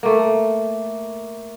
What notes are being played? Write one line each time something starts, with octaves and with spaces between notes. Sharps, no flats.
A3 A#3